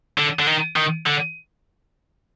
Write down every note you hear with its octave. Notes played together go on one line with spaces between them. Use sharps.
D3
D3
D#3
D#3
D3